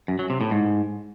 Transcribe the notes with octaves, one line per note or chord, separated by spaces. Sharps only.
F#2
F#3
C3
A2
G#2